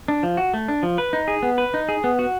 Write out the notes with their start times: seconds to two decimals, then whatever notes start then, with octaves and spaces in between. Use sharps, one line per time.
0.08 D4
0.23 F3
0.37 F#4
0.54 A3
0.68 D4
0.83 F3
0.98 B4
1.13 D#4
1.28 G#4
1.43 B3
1.58 B4
1.74 D#4
1.89 G#4
2.04 B3
2.19 F#4